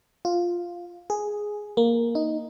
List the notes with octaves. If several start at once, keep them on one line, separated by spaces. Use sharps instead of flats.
F4
G#4
A#3
D#4